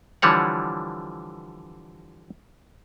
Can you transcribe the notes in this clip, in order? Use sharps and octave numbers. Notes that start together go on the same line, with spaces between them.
D3 E3 F3 G3 C#5 F#5